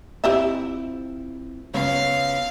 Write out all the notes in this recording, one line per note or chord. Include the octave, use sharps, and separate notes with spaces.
C4 E4 F4 G4 D#5 E5
C#2 F#2 B3 C#4 C#5 F5